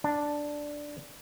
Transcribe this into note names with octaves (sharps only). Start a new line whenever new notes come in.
D4